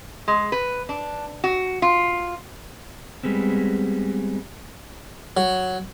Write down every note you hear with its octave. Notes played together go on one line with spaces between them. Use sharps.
G#3
B4
D4
F#4
F4
G3 G#3 B3 C4
F#3